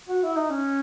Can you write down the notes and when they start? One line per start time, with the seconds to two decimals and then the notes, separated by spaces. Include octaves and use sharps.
0.08 F#4
0.23 E4
0.36 D#4
0.50 C#4